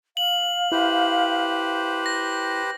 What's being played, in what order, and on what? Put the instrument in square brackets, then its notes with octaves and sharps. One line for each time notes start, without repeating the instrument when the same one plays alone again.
[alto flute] F5 [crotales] F#7
[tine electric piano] E4 [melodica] G4 B4 C5
[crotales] A#6